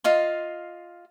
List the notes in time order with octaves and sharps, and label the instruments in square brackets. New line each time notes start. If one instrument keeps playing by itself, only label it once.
[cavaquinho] F4 D#5 F5 C6